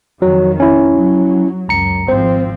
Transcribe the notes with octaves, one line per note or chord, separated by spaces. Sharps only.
F2 D#3 F#3
C#4 E4
F#3
C#2 F#2 A#5 C#7
G#1 F3 C4 C5